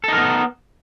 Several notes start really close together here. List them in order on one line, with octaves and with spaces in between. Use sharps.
A4 D#4 A#4 B3